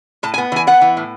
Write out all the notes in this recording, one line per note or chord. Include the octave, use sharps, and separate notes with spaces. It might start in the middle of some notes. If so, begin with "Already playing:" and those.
A2 A5
G#5
B3
E3 G#5
B3 F#5
E3
A2